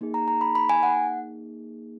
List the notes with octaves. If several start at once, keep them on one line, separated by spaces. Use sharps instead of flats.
A#3 D#4 G#4
A#5
A#5
B5
B5
G#5
F#5